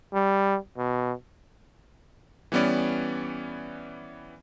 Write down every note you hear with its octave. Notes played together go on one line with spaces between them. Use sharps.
G3
B2
E3 G3 B3 C#4 D5